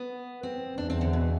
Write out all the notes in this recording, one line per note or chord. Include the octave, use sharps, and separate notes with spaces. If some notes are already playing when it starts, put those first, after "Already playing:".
Already playing: B3
C4
E2 D4
C4
D3
B2